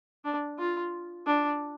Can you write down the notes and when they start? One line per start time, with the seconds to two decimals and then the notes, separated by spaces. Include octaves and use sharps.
0.25 D4
0.59 F4
1.26 D4